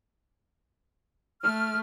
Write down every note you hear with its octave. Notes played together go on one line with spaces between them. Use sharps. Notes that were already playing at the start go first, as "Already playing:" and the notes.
A3 F6